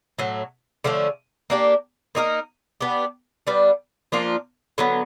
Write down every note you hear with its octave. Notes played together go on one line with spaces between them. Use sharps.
A2 F#3 A3
D3 F3 A3 C#4
A#3 D4 G4
A#3 D#4 F#4 A#4
B3 D4 G4
G3 B3 D4
F3 A#3 D4 F4
D3 F#3 B3